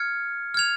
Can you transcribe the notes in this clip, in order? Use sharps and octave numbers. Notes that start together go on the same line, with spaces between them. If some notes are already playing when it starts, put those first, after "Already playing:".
Already playing: F6 G#6 C#7
F6 G#6 F7